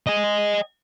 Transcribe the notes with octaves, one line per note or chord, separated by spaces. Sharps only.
D#5 G#5